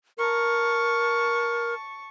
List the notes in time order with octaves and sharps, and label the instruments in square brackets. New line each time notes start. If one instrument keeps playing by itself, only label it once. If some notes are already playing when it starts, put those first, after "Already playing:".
[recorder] A#4 [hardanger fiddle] A5 C#6